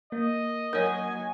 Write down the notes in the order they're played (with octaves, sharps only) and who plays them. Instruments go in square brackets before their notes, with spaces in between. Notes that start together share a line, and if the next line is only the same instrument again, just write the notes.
[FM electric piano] A#3 [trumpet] D#5
[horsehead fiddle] F#3 G#5 [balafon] A#4 C#5